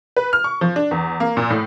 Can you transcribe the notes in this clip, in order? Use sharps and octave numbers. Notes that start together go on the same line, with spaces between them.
B4
F6
C#6
F3
D4
E2
A#3
A#2
A2